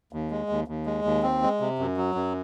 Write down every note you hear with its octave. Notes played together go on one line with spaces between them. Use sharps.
D#2
G#3
D#2
D#2
G#3
D#2
C4
G#3
C3
F#2
F#3
F#2